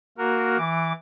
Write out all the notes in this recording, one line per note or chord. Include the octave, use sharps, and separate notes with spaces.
A#3 F#4 A#4
E3 D6